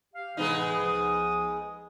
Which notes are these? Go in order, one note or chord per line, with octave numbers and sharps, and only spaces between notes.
G4 F5
A2 C3 E3 G#3 B3 D#4
C#2 F3 D#6